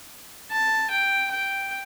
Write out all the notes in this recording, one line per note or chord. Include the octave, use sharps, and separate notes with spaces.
A5
G5
G5